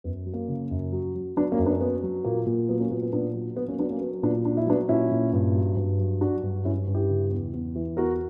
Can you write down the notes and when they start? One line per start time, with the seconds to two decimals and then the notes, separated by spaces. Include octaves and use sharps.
0.04 F#2 B3
0.26 F#3
0.33 A#3 C#4
0.48 C#3
0.71 F#2
0.92 F#3
1.15 F#3
1.37 F#3 B3 D4
1.52 A#3 C#4
1.59 F#2
1.66 B3 D4
1.81 F#3 B3
2.03 F#3
2.24 A#2 A#3
2.47 A#2
2.69 F#3 B3
2.80 A#3 C#4
2.91 A#2 B3
3.02 B3
3.13 A#2 B3 D4
3.35 F#3
3.56 F#3 B3
3.68 A#3 C#4
3.79 F#3 B3 D4
3.90 A#3 C#4
4.01 F#3 B3
4.23 A#2 B3 D4
4.45 F#3 D4
4.57 E4
4.67 F#3 B3 D4
4.89 A#2 C#4 E4
5.11 A#2
5.33 G2
5.55 F#3
5.77 G2
5.99 F#3
6.21 F#3 D4 F#4
6.43 G2
6.65 G2 C#4 E4
6.87 G2
6.94 E4 G4
7.09 C#3
7.31 E2
7.54 E2
7.76 E3
7.97 E2 F#4 A#4